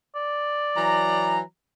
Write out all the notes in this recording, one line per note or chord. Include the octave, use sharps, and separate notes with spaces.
D5
E3 F#3 A#5